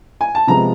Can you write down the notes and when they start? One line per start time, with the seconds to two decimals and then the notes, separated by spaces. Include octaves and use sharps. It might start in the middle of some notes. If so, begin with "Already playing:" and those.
0.21 G#5
0.35 A5
0.47 C3 F3 G#3 B3 A#5